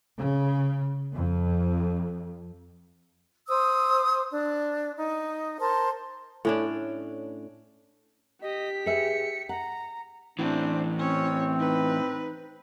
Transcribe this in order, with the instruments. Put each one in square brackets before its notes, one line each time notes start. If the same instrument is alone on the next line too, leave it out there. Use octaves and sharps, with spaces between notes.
[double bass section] C#3
F2
[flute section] C5 D#6 E6
D4
D#4
A#4 C5 A5
[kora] A2 C#4 D4
[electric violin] G4 B6 [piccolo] D#5
[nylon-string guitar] G#4 B4 E5 [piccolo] C#7
[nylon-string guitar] F#5 [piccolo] A#5
[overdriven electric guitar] A2 E3 [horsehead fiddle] C4 [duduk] D4
[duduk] C4 [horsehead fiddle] C#4 C#5
[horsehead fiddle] D#4 B4